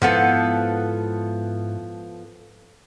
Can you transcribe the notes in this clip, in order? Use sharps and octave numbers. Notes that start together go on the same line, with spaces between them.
G#2 F3 B3 E4 A4